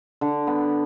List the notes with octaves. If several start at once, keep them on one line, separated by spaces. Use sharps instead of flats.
D3
B3